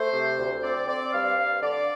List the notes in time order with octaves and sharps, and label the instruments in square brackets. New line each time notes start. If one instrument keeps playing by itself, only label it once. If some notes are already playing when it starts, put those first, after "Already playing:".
Already playing: [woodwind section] A3 C5
C3
D2
C4 D5
C4 D5
G2 F5
G2
D3 D5